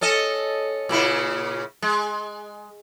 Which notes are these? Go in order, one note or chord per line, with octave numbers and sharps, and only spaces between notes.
C#4 A4 D#5
A#2 C#3 E4
G#3